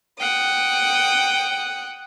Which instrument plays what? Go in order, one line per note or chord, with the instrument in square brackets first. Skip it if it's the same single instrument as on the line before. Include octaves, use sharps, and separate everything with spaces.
[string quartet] F#5 G5 D#6